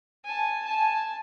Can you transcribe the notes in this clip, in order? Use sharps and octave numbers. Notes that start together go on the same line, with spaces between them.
G#5 A5
G#5 A5